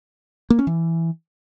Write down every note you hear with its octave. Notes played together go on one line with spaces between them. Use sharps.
A#3
C#4
E3